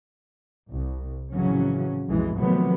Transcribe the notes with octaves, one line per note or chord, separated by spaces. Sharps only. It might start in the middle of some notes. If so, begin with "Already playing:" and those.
C2
F2 A2 C#3 E3 F#3 C#4
B1 F2 E3 G#3
C3 D#3 F3 F#3 A3 B3